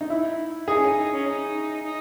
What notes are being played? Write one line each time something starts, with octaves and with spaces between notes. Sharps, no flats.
D#4
E4
D#4 G#4
C#4
D#4
C#4
D#4
D#4